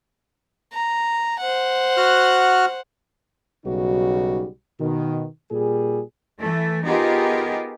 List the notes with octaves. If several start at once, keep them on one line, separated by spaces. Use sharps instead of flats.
A#5
C5 F#5
F#4 F6 F#6
B1 C#3 G3 D#4 F#4
B2 D#3
A#2 G3 G#4
E3 A3
B3 D#4 F4 G4 G#4 A#4